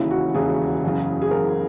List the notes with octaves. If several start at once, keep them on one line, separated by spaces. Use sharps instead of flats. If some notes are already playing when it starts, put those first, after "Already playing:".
Already playing: E1 D#2 C#3 E3 E4
F#4
E1 D#2 C#3 E3 G#4
F#1 E2 C#3
G#4
F#1 E2 C#3 A#4